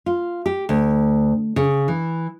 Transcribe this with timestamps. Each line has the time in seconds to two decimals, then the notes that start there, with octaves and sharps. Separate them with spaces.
0.06 F4
0.46 G4
0.69 D2
1.56 C#3
1.88 E3